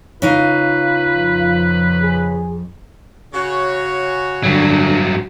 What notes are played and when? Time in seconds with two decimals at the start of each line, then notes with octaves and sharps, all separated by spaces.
0.22 C#3 D#4 F4 B4 F5
1.16 F2
2.02 G#4
3.33 C#3 F#4 C#5
4.44 G2 D3 F#3